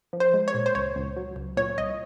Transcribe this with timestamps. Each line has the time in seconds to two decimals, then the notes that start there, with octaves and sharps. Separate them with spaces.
0.13 F3
0.20 C5
0.34 G#3
0.48 C#5
0.54 A#2
0.66 C5
0.75 C#2 C#5
0.96 C#2
1.17 F#3
1.36 C#2
1.57 A#2 C#5
1.78 C2 D#5